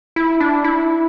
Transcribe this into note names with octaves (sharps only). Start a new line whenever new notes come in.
E4
D4
E4